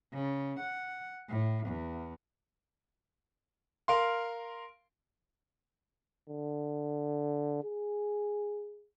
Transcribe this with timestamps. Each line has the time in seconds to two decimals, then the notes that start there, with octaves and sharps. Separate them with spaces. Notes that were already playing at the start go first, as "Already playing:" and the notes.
0.13 C#3
0.60 F#5
1.30 A2
1.67 E2
3.88 A#4 F5 C6
6.29 D3
7.63 G#4